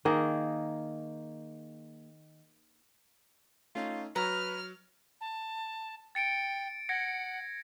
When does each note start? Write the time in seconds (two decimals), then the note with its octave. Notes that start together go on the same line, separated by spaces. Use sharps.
0.05 D#3 A#3 G#4 D#5
3.75 A3 C#4 D#4 F4
4.16 F#3 F#4 B4 A#5 C#6 F6
5.21 A5
6.15 G5 A6 C#7 D7
6.89 F#5 G#6 A#6 C#7